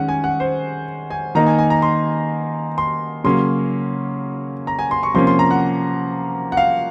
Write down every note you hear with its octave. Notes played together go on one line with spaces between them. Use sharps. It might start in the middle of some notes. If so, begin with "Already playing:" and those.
Already playing: D#3 G#3 C#4 F#5
G#5
F#5
C5
G#5
D#3 A#3 D#4 A#5
G#5
G#5
A#5
C6
C6
C#3 F#3 A#3 C#4 C6
A#5
G#5
C6
C#6
C3 F3 A#3 C#4 C6
C6
A#5
F#5
F#5
F5